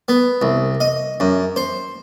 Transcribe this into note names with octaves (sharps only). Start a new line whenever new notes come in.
B3
C2
D#5
F#2
C5